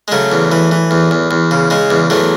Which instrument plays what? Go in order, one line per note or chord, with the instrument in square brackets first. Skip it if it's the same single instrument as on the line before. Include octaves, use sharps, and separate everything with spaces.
[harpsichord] G#3
C#3 F#3 A3
E2
E3
E3
E2
E2
E2
C#3
C#3 G#3
E2
E2 F#3 A3